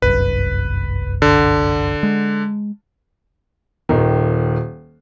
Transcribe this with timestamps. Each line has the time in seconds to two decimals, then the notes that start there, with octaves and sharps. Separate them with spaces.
0.02 G1 C2 F#2 B4
1.22 D3
2.03 G#3
3.89 D#1 D#3